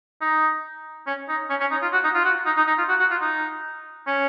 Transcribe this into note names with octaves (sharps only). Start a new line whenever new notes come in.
D#4
C#4
D#4
C#4
C#4
D#4
F4
F#4
D#4
F4
F#4
D#4
D#4
D#4
F4
F#4
F#4
F4
D#4
C#4